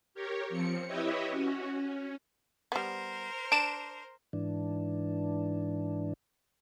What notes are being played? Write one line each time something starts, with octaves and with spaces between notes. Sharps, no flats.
G4 A#4 C#5
F3 C4 C#7
E4 G4 B4 C#5 D#5 E5
C#4 F#4
C#4
G3 B3 A#4 C5
D4 D7 E7
G#2 E3 D4